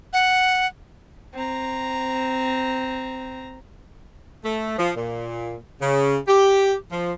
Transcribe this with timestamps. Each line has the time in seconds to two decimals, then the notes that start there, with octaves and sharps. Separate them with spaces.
0.13 F#5
1.34 C4 A#5
4.44 A3
4.78 F3
4.96 A#2
5.81 C#3
6.28 G4
6.91 F3